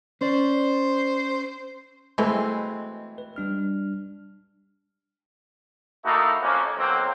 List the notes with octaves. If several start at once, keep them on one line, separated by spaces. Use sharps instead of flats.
C#4 C5 D5
B2 E3 G#3 A3 C4
B4
G3 D4 F6
A3 A#3 D#4 E4 F#4 A4
F2 A#3 C#4
B1 F#3 A#3 C4